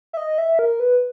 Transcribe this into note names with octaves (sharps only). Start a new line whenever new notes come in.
E5
D#5
E5
A#4
B4